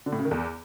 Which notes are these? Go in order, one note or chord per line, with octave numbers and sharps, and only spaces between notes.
D3
A2
C#3
D#3
E2